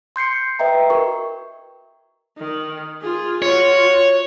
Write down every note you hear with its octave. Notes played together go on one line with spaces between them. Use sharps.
C6 G6 C7 C#7
B4 D#5 E5 G5 A#5
F#4 A#4 C#6
D#3
F4 G#4
F4 F#4 C#5